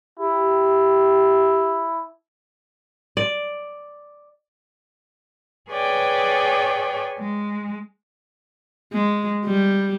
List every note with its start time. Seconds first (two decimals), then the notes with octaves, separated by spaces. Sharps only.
0.20 E4 G4
3.17 D5
5.71 G#4 B4 C#5 D5 G5 G#5
7.18 G#3
8.93 G#3
9.46 G3